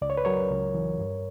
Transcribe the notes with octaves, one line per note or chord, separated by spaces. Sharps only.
C#2 D5
C#5
B4
F#3 A#4 C#5
C#2
E3
G2